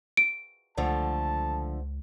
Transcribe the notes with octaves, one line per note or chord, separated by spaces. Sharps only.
D7
C#2 D3 F3 A3 A5